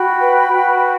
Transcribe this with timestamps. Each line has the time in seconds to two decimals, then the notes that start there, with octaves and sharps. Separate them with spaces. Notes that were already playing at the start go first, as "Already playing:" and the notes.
Already playing: F#4 G5 B5
0.21 B4
0.53 F#4